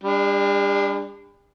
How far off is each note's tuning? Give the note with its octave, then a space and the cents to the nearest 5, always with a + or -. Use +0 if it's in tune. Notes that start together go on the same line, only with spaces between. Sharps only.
G3 +40 D4 +0